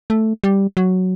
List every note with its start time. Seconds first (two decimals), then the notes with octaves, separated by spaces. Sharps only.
0.10 A3
0.44 G3
0.77 F#3